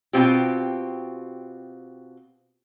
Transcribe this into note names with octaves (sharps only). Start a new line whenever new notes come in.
B2 C4 F4 G4